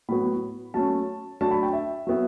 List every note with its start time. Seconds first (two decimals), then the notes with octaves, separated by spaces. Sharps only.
0.08 A2 F#3 B3 B5
0.74 F#3 A3 C#4 A5
1.41 F#3 A3 D4 A5
1.51 B5
1.63 G5
1.73 E5
2.07 F#3 B3 E4